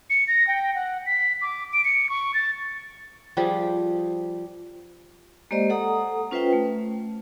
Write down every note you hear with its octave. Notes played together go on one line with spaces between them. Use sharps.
C#7
A#6
G5
F#5
B6
D6
D7
C#7
C#6
A6
F3 G3 G4 G#4
G#3 A#3 G4 C5 D5 D#5
A4 F#5 A#5 D#6
C#4 F4 B4 C5 E5 G5
A3